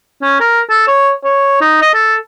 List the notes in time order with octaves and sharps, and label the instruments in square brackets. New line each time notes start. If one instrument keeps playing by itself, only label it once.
[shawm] C#4
A#4
A4
C#5
C#5
D#4
D#5
A4